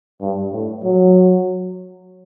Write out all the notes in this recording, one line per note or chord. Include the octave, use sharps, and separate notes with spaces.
G2
A2
F#3